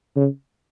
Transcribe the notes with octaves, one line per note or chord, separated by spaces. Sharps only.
C#3